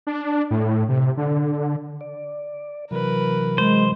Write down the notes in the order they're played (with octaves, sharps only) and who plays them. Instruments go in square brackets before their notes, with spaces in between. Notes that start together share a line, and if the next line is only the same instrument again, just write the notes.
[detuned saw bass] D4
A2
C3
D3
[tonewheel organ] D5
[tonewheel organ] C3 E3 F#3 [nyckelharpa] A#4 B4
[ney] G#3 [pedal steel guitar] C5